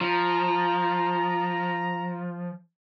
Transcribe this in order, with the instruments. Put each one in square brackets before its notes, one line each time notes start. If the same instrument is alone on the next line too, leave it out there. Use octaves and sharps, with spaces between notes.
[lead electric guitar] F3 [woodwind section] A#5